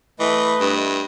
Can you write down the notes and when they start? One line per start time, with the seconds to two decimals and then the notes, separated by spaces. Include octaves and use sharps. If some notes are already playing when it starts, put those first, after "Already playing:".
0.20 E3 A3 B4 D#5
0.61 G2